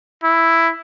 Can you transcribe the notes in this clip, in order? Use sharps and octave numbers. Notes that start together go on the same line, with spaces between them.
E4